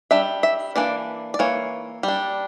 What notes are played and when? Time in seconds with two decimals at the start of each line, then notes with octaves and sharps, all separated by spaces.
0.11 G3 D4 E5
0.43 E5
0.76 E3 A#3 D4 D5
1.34 D5
1.39 E3 A#3 C#5
2.03 G3 D4